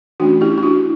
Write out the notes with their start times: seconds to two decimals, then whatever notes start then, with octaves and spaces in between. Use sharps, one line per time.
0.20 E3 A3 C#4 D4 F#4
0.41 E4 G4
0.58 E4
0.63 D4 F#4